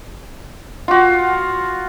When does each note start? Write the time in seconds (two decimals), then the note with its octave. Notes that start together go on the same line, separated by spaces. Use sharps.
0.88 F4 F#4